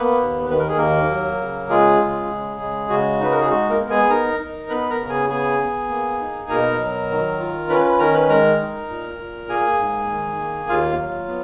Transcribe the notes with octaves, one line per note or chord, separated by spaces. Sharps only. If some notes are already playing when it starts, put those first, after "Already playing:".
Already playing: A#3 B3 B4
D#2
D#3 B4
A#4
G#4
D#2 A#3 A#4
F#3
C#3
G#3 F4 G#4
C#3
C#3
G#3
C#3 F#4
D#4 B4
A#4
G#4
G#3 F#4
A#3 A#4
B3
G#4 G#5
D#4 A#4 A#5
D#4
B3 B4 B5
A#4 A#5
C#3
G#4 G#5
B3 G#4 G#5
B3
A#3
D#4
B2 A#4 A#5
F#3
D#3
F4
C#4 B4 B5
B4 B5
D#3 A#4 A#5
B4 B5
G#3 A#4 A#5
D#4
A#2
A#2
A#3 G#4 G#5
G#2
D#3
A#3
D#2 F4 F5
F#3
B3